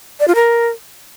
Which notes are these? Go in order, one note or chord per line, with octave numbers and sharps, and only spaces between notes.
D5
F4
A#4